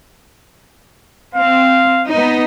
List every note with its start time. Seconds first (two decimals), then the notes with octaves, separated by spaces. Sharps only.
1.35 C4 F5
2.09 B3 D#4